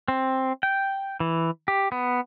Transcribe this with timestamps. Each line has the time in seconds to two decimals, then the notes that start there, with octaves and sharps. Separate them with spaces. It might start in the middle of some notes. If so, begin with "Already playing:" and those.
0.08 C4
0.63 G5
1.20 E3
1.68 G4
1.92 B3